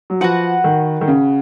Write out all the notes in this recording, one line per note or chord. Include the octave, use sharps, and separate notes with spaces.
F#3
F3 F#4 B4 F#5
D#3
D#3
C#3